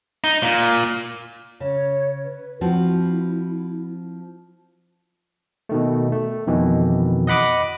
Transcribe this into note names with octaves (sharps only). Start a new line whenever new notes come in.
D#4
A#2
C#3 C#5
B4
F3 C4 E4 F#4
B2 D#3 A3
A3
F2 B2 D#3 E3
D#5 F#5 B5 D6 D#6